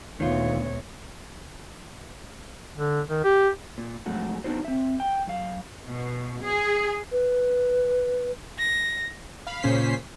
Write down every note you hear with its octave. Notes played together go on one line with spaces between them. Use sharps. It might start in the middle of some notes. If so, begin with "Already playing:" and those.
D2 A#2 D#3 B3 F4 C#5
D3
D#3
G4
A#2
F2 G#2 F#3 A3 F#4
B3 D4 D#4 F#4 C5
C4 E5
G5
F#2 F5
B2
G#4
B4
A#6
F5 B5
A#2 C#3 C#4 C5 B6 C7